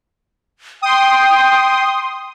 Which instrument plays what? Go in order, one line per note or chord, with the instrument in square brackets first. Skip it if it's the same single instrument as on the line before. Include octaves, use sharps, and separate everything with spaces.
[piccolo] G5 [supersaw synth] C6 D#6